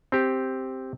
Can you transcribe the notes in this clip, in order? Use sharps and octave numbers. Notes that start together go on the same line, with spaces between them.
C4 G4